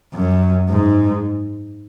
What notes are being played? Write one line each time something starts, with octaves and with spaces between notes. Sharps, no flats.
F#2
G#2